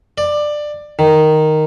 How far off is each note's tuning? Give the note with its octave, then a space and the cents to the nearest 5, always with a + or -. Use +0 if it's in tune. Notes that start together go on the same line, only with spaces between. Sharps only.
D5 +15
D#3 -5